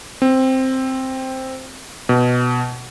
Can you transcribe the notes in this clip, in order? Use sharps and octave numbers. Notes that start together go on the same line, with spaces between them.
C4
B2